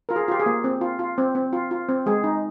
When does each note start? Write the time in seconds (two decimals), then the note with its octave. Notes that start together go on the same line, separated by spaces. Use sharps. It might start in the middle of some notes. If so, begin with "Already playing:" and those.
0.09 F4 A#4
0.16 G#4
0.28 F4 G4
0.40 G#4
0.46 A#3
0.64 C4
0.81 F4
0.99 F4
1.18 C4
1.35 C4
1.53 F4
1.71 F4
1.89 C4
2.06 G#3 G#4
2.24 D#4